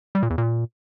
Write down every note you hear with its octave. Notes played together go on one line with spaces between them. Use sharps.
G3
A#2
E2
A#2